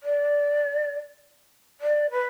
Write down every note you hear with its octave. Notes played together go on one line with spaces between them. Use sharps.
D5
D5
B4